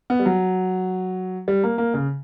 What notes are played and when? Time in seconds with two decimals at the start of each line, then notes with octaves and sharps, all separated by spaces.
0.10 B3
0.20 G3
0.26 F#3
1.48 G3
1.64 A#3
1.78 A#3
1.94 C#3